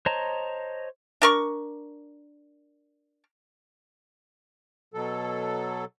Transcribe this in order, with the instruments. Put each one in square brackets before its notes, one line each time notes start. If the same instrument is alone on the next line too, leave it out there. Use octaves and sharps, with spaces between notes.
[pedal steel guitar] C5 C#5 D#5 A5 A#5
[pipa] D4 A#4 C#6
[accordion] B2 F#3 A4